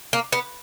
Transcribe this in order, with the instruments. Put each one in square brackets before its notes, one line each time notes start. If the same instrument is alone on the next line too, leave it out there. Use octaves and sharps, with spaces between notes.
[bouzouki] A#3
B3